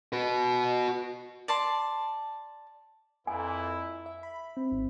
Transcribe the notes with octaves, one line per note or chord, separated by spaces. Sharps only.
F#4 B4
D5 A5 C6
F2 A#2 E3 E4 G#5
E5
B5
B5
C4
G#1